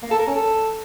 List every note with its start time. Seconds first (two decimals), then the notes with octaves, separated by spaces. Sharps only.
0.03 A#3
0.11 A4
0.19 A#4
0.27 C#4
0.35 A4